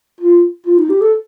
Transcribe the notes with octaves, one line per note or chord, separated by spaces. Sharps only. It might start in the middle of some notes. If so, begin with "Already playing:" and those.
F4
F4
D#4
G4
A4